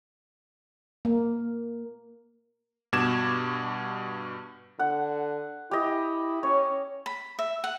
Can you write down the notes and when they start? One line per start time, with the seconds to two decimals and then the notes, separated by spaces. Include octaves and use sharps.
1.05 A#3
2.93 G2 B2 D6 G#6 E7
4.79 D3 F#5
5.71 E4 G4 D#5
6.43 C#4 C#5
7.06 B5
7.39 E5
7.64 F#5